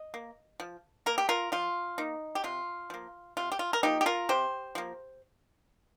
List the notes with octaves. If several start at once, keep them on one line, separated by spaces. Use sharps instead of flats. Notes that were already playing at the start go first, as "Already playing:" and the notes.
Already playing: D#5
A#3
F3
A#3 A#4
G4
F4 A#4
F3 F4
A#3 D#4
G4
C3 F4
F3 A#3
C3 F4
G4
F4
A#4
F3 A#3 D#4 G4
G4
F4 A#4
C3 G4 C5
F3 A#3